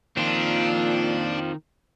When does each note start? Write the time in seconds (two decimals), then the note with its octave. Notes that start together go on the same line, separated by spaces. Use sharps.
0.17 A#2 D#3 C4 D4 F4